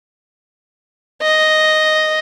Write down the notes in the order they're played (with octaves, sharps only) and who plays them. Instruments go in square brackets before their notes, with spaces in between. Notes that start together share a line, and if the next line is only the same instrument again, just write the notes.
[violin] D#5